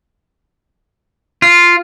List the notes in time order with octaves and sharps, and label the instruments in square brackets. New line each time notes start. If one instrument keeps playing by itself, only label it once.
[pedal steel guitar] F4